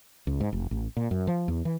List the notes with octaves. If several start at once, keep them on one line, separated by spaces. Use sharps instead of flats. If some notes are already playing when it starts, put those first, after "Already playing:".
C#2
G#2
F1
A1
A#2
F#2
F3
E2
E3